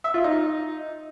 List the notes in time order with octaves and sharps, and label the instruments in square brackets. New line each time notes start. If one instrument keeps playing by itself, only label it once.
[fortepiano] E5
F4
D#4